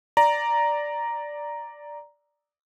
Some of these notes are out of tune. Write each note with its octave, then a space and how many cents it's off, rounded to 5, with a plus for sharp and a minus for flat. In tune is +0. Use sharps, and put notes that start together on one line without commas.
D5 +0 A#5 +0